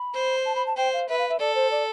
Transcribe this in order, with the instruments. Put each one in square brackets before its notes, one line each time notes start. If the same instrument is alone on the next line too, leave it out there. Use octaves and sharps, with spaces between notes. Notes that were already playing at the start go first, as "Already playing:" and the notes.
Already playing: [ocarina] B5
[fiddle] C5
[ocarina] A5
B5
A5
[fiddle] C5 [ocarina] G5
[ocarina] F5
[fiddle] B4 [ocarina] E5
[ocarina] F5
E5
[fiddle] A4 [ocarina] D5
[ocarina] C5
D5